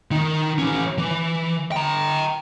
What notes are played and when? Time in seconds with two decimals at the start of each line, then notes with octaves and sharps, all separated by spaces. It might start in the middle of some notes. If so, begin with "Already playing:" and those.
0.11 D#3 D#4
0.58 E3 C#4
0.98 E3
1.72 G5 A#5